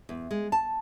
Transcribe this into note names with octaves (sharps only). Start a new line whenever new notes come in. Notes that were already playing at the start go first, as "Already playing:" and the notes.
E2
G#3
A5